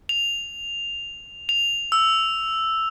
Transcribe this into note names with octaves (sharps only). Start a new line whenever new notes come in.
F7
F7
E6